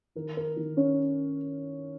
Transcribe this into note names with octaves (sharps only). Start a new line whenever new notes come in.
D#3 A#4
A#4
D#3
C#4 C#5